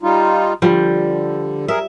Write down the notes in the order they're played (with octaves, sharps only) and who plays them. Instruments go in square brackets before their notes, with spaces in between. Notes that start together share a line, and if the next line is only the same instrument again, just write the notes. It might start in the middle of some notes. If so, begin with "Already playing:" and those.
[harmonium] G3 D#4 F4
[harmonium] D3 [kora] F3 G3
[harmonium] G#4 A#4 [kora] E5